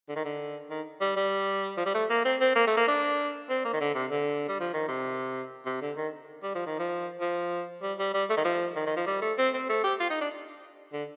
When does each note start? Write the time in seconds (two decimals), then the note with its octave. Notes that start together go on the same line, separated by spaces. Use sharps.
0.09 D3
0.16 D#3
0.25 D3
0.70 D#3
1.01 G3
1.17 G3
1.77 F3
1.86 G3
1.94 A3
2.10 A#3
2.25 C4
2.41 C4
2.56 A#3
2.67 A3
2.77 A#3
2.88 D4
3.50 C4
3.65 A#3
3.73 D#3
3.81 D3
3.95 C3
4.11 D3
4.49 G3
4.60 F3
4.73 D#3
4.88 C3
5.66 C3
5.81 D3
5.97 D#3
6.43 G3
6.55 F3
6.67 D#3
6.79 F3
7.20 F3
7.82 G3
7.99 G3
8.14 G3
8.30 A3
8.37 D#3
8.45 F3
8.76 D#3
8.87 D#3
8.97 F3
9.07 G3
9.22 A3
9.38 C4
9.54 C4
9.70 A3
9.84 G4
10.00 F4
10.11 D#4
10.21 D4
10.93 D3